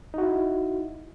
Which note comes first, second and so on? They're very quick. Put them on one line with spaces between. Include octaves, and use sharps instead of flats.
D#4 F#4 E4